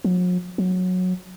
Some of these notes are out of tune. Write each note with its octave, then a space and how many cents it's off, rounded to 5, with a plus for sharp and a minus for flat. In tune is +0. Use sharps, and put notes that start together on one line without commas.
F#3 -45
F#3 -15